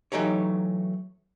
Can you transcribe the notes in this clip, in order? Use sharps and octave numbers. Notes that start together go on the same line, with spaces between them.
E3 F#3 A3 D#4 G4 C#5